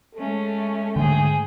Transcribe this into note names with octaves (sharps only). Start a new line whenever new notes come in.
G#3 A3 C#4 A4
G#2 D3 A3 G#4 G5